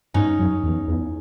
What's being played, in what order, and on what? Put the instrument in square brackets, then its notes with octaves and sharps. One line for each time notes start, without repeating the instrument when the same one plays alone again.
[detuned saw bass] G2 [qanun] C#4 D#4
[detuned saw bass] F#2
E2
E2